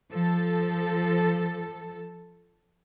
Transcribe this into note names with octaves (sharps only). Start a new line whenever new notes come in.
F3 A4